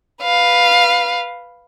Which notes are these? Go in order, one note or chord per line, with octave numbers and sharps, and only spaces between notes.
B4 F5